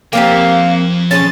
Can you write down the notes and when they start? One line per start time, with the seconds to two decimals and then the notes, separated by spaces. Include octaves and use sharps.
0.13 F3 A#3 C4 G4 F5 G5
1.11 G#3 C#4 A6